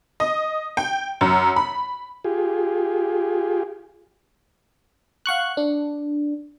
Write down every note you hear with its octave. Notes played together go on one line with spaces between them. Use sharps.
D#5
G5
F#2
B5
F4 G4 G#4
F5 F#5 C#6 F#6
D4